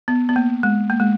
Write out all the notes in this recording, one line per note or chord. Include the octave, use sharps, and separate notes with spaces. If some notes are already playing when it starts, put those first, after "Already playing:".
B3
B3
A#3
G#3
A#3
G#3